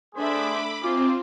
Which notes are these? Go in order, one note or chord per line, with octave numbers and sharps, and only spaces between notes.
A3 B3 D4 G#4 C5 E5 B5 D6
C4 D#4 F4 G#5 D6